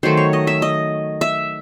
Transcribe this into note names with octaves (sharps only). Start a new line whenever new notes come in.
D#3 F#3 A3 C5
C#5
D#5
E5
D#5
E5